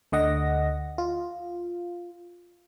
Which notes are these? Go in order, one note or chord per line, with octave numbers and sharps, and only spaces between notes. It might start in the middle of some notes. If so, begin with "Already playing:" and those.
D2 D3 D#5 F#5 A#6
F4